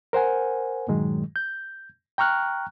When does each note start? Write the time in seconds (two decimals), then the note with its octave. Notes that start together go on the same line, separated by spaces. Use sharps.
0.13 A#4 C5 F#5 G#5
0.88 G2 A#2 D#3 F#3 G#3
1.36 G6
2.18 G5 A#5 C#6 F6 F#6